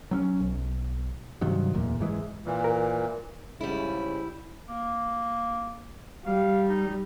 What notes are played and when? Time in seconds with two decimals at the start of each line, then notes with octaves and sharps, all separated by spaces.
0.11 F#3 C4 C#4
0.40 B1
1.41 G2 C3 D#3 F#3
1.73 D1 E2 A#2
1.99 F#1 G#2 E3 G#3
2.46 A#2 E3
2.64 A#4
3.61 G#2 C#3 G3 E4
4.69 A#3
6.25 G3 F5
6.68 D#4